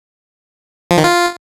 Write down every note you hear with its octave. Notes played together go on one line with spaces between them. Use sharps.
F3
D#3
F4